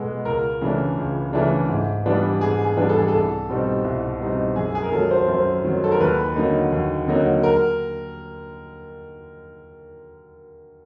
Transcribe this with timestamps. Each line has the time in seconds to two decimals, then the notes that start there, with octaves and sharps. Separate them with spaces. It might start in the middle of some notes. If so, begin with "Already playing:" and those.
Already playing: B2 G#3 B3 A4
0.25 C#2 A#4
0.61 C#3 E3 A3 D4
0.98 C#2
1.33 C#3 E3 A3 D4
1.69 G#2
2.06 E3 G3 B3 D4
2.41 G#2 G#4
2.65 G#4
2.77 E3 G3 B3 D4
2.89 A4
2.99 G#4
3.08 C2 A4
3.49 B2 G3 C4 D#4
3.84 C2
4.21 B2 G3 C4 D#4
4.56 F#2 G#4
4.75 G#4
4.83 A#4
4.92 D#3 F#3 A4
5.11 C5
5.28 F#2 C5
5.64 D#3 F#3
5.84 A4
5.92 A#4
6.00 D#2 B4
6.36 D3 F#3 A#3 D#4
6.72 D#2
7.08 D3 F#3 A#3 D#4
7.43 A#4